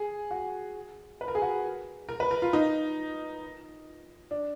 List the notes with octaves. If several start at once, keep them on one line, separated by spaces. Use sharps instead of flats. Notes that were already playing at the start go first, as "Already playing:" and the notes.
Already playing: G#4
F#4
B4
A#4
G#4
F#4
A#4
B4
A#4
F4
D#4
D4